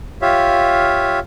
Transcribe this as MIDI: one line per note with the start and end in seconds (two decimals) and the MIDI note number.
0.22 1.19 65
0.22 1.19 67
0.22 1.19 73
0.22 1.19 76
0.22 1.19 77